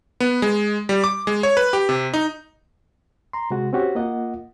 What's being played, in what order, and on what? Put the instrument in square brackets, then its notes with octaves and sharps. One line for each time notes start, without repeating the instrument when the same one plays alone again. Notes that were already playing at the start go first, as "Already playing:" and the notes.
[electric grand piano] B3
G#3
G3
D6
G#3
C#5
B4
G4
C3
D#4
[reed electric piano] A#5 C6
C3 G#3 F#4
C4 C#4 F#4 G4
A#3 F4 D#5 F#5